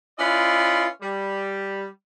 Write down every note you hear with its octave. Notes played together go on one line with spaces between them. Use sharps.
C#4 E4 F4 B4 D5 D#5
G3